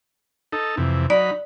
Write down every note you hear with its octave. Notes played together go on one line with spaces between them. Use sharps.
D#4 A4
F2 C3 E3
F#3 D#4 D5 B5